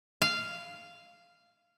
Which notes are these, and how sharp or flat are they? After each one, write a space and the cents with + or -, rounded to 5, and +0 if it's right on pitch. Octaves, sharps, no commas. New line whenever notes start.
F5 -10